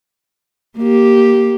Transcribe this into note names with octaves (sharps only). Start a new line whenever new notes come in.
A#3 G4